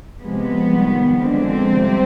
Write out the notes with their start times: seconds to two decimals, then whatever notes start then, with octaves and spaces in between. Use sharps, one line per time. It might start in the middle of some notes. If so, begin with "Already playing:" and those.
0.20 C3 F3 G#3 B3
0.71 F2 D#3 G3
1.22 F2 D3 G#3 C4
1.73 F2 C3 G3